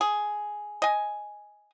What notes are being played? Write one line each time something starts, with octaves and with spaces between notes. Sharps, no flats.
G#4
D#5 G#5